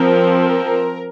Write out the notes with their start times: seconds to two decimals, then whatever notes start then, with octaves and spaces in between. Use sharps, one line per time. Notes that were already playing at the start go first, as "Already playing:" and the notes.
Already playing: F3 C4 A#4
0.41 A#4